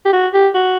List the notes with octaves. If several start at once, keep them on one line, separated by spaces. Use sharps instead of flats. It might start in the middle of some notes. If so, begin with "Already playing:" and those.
G4
F#4
G4
F#4